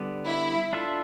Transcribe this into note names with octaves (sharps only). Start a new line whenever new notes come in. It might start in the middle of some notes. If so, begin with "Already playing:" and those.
Already playing: D3 G3 B3
E4
D4 F4 A4 E5